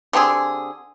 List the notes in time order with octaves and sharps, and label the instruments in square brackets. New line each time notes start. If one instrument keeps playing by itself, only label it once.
[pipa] D3 C4 G4 G#4